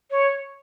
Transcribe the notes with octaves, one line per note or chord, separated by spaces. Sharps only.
C#5